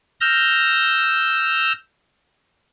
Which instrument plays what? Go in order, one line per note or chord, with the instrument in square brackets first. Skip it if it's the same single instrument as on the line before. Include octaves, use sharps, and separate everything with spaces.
[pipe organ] E6 F6 G6 A#6